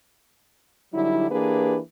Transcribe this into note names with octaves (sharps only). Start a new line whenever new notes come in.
D3 F#3 G3 D#4 E4
E3 A#3 D4 G4 G#4 B4